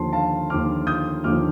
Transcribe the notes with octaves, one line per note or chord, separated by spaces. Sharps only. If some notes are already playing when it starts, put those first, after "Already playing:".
Already playing: D#2 D3 F3 A5 C6
F5 A5
D#2 D3 F3 D6 F6
D#6 G6
D#2 D3 F3 D6 F6